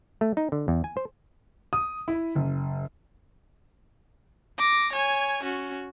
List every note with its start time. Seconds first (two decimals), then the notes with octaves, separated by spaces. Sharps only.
0.21 A3
0.37 D#4
0.52 D3
0.68 E2
0.84 G#5
0.97 C5
1.73 D#6
2.08 E4
2.35 F#1
4.58 D6 A#6
4.93 C#5 G#5
5.43 C#4 F#4